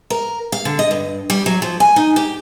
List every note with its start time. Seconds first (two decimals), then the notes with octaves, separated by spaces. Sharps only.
0.10 A#4
0.52 F5
0.65 D3
0.79 D#5
0.91 G2
1.30 G3
1.46 F#3
1.62 F3
1.80 G#5
1.96 D#4
2.16 G4